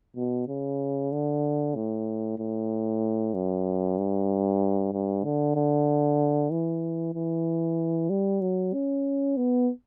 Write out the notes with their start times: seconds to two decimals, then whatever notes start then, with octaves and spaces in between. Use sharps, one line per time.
0.16 B2
0.48 C#3
1.12 D3
1.75 A2
2.39 A2
3.34 F#2
3.98 G2
4.93 G2
5.24 D3
5.56 D3
6.51 E3
7.14 E3
8.10 G3
8.41 F#3
8.73 C#4
9.37 B3